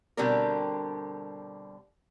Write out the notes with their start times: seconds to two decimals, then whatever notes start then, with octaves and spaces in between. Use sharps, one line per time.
0.17 B2 D3 G3 C4 D4 A#4